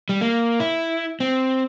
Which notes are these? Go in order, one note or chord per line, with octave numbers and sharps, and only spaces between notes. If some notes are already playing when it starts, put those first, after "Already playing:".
G3
A#3
E4
C4